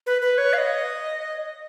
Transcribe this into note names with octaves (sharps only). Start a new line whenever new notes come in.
B4
B4
C#5
F5
D#5